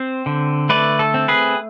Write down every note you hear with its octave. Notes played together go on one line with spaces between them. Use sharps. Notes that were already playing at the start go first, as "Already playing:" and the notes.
Already playing: C4 C5
D3
A3 B4 D5
A4
C4
G#4 B4